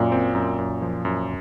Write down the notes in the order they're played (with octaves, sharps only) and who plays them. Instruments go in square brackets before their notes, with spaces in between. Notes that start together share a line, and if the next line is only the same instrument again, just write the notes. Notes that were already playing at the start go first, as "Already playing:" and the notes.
Already playing: [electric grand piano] F#2 [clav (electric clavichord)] A#2
[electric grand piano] C4
F#2
F#2
F3
F#2